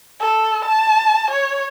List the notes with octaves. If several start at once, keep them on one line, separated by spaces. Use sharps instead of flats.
A4
A5
C#5